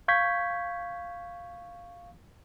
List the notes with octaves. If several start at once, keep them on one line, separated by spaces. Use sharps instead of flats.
F5 C#6 G6 G#6 B6